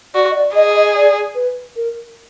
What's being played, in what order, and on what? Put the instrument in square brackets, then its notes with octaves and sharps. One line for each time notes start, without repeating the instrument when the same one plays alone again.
[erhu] F#4 [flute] D5
[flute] D#5
D5
[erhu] G#4 [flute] D#5
[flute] D#5
D5
B4
A#4